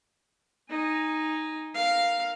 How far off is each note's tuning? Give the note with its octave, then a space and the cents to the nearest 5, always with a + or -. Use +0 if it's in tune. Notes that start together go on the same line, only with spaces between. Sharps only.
D#4 +0 G#5 -15
A#4 +0 F5 +0